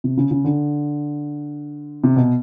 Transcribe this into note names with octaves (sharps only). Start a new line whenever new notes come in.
C3
C#3
C#3
D3
C3
B2